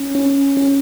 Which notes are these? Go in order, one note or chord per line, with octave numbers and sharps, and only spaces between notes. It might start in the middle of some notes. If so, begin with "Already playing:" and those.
Already playing: C#4
C#4
C#4